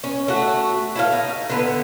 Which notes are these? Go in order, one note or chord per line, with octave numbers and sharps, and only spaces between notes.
C#4
A3 F#4
E4 A4 F5
D#4
D3 B3 E4